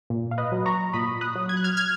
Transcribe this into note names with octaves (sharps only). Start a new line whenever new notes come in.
A#2
F5
B4 D#5
F#3
A#5 C#6
A#2 B5 D#6
D#6 F#6
F#3
G#6
F#6
F6 G#6
F6 G#6